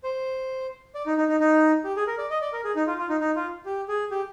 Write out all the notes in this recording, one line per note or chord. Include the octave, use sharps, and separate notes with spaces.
C5
D5
D#4
D#4
D#4
D#4
G4
G#4
A#4
D5
D#5
D5
A#4
G#4
D#4
F4
F4
D#4
D#4
F4
G4
G#4
G4